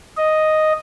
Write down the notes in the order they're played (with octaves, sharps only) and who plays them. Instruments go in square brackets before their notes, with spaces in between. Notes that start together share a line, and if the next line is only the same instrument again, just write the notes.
[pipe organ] D#5